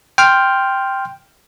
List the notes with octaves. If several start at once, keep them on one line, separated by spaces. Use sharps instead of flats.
G5 C6 F6